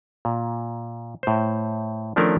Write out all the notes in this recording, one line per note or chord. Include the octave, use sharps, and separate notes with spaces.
A#2
A2 C5
D#3 F3 A3 C#4 D4 A#4